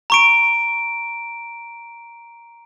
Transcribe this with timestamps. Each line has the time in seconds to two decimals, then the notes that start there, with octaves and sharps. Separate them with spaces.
0.10 A#5 C#6 D7